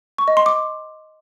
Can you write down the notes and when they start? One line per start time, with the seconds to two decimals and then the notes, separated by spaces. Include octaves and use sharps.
0.18 C#6
0.28 D#5
0.37 C6
0.46 D6